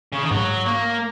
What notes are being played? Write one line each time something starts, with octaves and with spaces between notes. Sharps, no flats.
C#3
D#3
G#2 F#3
A#3